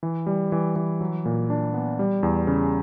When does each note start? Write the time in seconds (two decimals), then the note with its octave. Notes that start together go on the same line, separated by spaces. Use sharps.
0.03 E3
0.26 G3
0.52 E3
0.76 E3
1.01 F#3
1.25 A#2
1.50 D4
1.74 B3
1.99 G3
2.23 E2
2.47 C#3